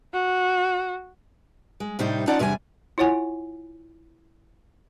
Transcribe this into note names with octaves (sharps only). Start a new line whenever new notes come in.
F#4
G#3
A2 C3 G3 D4 D#4 C5
C#4 D#4 F4 D5 F#5 A5
E2 C3 G3 D4 G#5
E4 F4 C#5 F#5 G#5